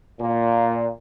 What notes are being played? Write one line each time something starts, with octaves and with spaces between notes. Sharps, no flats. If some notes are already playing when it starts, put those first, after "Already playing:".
A#2